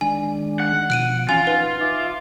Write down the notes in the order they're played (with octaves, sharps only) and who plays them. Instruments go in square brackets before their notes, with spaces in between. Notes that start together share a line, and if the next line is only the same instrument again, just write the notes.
[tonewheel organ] D#3 G#3 D4 [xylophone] G#5
[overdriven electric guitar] F#5
[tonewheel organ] B2 F3 [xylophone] F#6 D7 D#7
[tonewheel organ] E3 C#4 [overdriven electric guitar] F4 [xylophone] G#5
[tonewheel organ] D#4 [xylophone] B4
[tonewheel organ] E5 D6